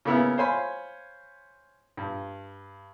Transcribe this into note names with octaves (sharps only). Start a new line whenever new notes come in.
C#3 A#3 B3 E4
C5 C#5 F5 G#5 B5 C6
G2